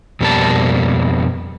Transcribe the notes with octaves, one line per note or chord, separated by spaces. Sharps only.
F2 B2 G3 A#3 A5